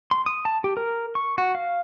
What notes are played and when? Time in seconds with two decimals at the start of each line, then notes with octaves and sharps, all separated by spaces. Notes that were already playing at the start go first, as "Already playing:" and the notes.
0.11 C6
0.26 D#6
0.45 A5
0.64 G4
0.77 A#4
1.15 C#6
1.38 F#4
1.55 F5